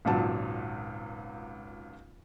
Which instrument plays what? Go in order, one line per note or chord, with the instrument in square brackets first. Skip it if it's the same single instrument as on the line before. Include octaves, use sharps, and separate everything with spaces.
[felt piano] G#1 C#2 A#2 F#3 A5